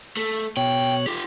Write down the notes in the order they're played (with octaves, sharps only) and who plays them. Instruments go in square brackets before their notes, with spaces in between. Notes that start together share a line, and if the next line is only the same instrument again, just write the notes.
[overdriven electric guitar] A3
[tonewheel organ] B2 C#5 F#6 [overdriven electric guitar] G5
[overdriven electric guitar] F4 G4